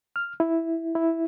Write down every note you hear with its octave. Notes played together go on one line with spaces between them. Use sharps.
F6
E4
E4